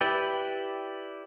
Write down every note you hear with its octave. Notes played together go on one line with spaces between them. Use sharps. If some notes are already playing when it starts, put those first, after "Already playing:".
E4 G4 B4 D5 G5